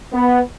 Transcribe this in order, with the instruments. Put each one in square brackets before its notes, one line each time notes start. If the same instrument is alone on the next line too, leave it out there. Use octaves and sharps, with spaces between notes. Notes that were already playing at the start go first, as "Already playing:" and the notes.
[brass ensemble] B3